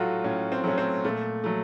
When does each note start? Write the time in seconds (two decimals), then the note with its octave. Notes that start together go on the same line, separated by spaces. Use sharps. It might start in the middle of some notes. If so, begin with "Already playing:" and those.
Already playing: A2 F#3 A3 F4 F#4 A4
0.24 A2 C#4
0.52 C4
0.64 F#3 A3 C#4
0.78 C4
1.04 A#2 A3
1.44 F#3 A3